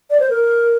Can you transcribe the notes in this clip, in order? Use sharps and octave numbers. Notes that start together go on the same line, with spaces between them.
D5
C5
A#4